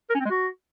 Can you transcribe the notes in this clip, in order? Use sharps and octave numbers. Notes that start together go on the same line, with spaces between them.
A#4
C#4
C4
G#3
F#4